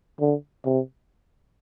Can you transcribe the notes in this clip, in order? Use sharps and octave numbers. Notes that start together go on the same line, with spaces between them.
D3
C3